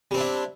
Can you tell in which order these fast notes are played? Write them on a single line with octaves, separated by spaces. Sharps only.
G3 C4 D4 E4